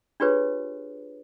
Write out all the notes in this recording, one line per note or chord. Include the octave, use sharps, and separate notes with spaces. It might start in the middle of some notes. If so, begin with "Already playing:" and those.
D4 F4 G4 G#4 B4 C#5